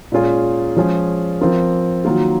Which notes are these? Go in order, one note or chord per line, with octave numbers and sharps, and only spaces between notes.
A#2 G#3 C#4 F4 G#4
F3 G#3 C#4 F4 G#4
F3 C4 F4 A#4
D#3 F#3 A#3 F4